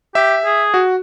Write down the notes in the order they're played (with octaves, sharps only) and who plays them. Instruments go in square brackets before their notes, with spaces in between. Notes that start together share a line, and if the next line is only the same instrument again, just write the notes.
[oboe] G4 [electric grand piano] E5
[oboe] G#4
[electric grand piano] F#4